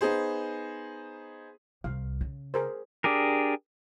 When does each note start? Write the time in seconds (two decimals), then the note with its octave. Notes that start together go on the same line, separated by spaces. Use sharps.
0.01 B3 D#4 G#4 C5
1.84 C2 F5
2.21 C#3
2.54 G#4 A#4 C5
3.04 D4 G4 G#4 A#4